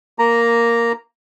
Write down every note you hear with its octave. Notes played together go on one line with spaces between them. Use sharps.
A#3 A#5